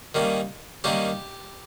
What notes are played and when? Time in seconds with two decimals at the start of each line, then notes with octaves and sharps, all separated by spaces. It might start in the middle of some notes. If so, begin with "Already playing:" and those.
0.15 D#3 G3 A#3 C#4
0.84 D#3 G3 A#3 C#4 G4